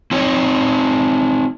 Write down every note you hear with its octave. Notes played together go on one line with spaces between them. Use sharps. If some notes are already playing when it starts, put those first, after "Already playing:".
C4 D#4 C#5